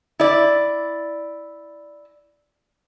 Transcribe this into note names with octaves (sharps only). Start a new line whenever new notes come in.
E4 D5